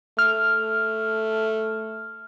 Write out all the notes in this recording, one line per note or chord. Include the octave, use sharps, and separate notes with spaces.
A3 F6